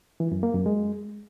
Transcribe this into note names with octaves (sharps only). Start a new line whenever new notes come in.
E3
F#2
A#3
F#2
G#3